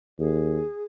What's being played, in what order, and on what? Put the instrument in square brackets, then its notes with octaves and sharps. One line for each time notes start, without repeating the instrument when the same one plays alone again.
[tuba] D#2 [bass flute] G#4